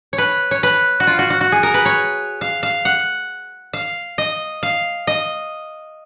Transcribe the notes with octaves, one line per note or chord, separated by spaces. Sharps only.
C#5
B4
C#5
B4
F#4
F4
F#4
F#4
F#4
G#4
A#4
B4
C#5
F5
F5
F#5
F5
D#5
F5
D#5